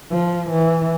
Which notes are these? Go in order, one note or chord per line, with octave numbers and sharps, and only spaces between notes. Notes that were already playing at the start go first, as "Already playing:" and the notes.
F3
E3